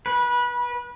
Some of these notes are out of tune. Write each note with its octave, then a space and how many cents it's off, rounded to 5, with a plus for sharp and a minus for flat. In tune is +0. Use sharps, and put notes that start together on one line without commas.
B4 -25